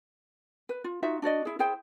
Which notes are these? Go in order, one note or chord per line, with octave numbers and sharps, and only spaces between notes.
B4
F4
D#4 F4 F#4 E5
D4 F#4 D5 D#5
E4 G#4
E4 G#4 C5 G5